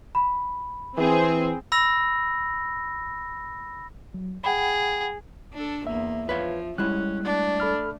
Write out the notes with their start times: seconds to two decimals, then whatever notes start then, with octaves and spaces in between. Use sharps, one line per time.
0.15 B5
0.98 E3 C4 G#4
1.72 B5 E6 A#6
4.14 F#3
4.44 G#4 F#5 G5 B5
5.54 D4 A4
5.87 E2 A#3 E5
6.29 F3 B4 C#5 F5
6.78 G3 G#3 C#4 E4 F#6
7.25 A3 D4
7.60 A4 B5 F6